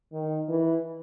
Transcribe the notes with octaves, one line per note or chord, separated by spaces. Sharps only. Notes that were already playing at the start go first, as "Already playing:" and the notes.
D#3
E3